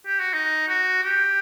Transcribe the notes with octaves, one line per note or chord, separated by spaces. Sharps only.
G4
F#4
D#4
F#4
G4